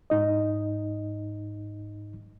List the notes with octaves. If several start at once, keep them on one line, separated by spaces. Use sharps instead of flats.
G#2 D#4 D#5